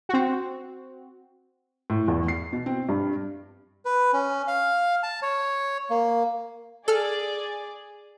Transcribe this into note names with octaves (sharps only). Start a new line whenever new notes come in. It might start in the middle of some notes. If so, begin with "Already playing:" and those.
C4 F#4
A2
E2
C7
B2
C4
G2
B4
C#4
F5
A5
C#5
A#3
G#4 A4 D5 F6